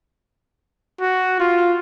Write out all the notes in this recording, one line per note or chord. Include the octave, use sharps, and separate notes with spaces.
F#4
F4